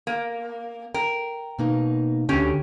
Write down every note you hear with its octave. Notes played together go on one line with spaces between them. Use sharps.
A#3
A#4 G5
B2 A#3 D#4
D2 D3 C#4 G4